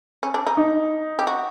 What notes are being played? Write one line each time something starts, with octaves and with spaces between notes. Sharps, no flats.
C#4
D4
D#4
D#4
G4
F#4